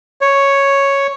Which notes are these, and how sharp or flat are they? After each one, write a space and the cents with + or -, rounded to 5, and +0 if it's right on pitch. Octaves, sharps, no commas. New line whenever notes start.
C#5 +0